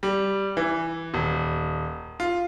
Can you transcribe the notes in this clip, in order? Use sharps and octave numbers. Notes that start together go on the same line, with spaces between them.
G3
E3
D#1
F4